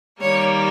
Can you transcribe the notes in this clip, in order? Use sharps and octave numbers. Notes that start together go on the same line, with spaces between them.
D#3 G3 A#3 C#5